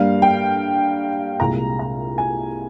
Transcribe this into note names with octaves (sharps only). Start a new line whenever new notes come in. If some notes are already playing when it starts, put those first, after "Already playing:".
Already playing: G2 G3 A#3 F5
G5
C2 A#2 G#3 A#5
A#5
G#5